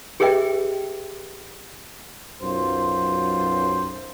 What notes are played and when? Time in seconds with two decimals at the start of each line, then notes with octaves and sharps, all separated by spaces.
0.20 G4 G#4 B4 D#5 E5 G5
2.42 B1 F#2 F4 C5